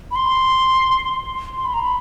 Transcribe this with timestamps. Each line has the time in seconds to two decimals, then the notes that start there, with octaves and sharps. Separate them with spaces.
0.11 B5
0.16 C6
1.57 C6
1.65 B5
1.74 A#5
1.82 B5